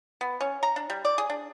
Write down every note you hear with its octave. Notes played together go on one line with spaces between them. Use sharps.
B3
C#4
A#5
D4
G3
D5
G#4
D4